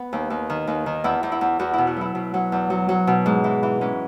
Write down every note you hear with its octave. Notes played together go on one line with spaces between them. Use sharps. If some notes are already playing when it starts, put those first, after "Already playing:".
Already playing: B3
D#2
D#2
D#3
D#2
D#3
E2 E4
E2
E4
E2
E2 F#4
B2 E4
F#4
F#3 E4
B2
F#3
E2
F#3
F#3
B2
G#2
E3
E3
G#2 C#4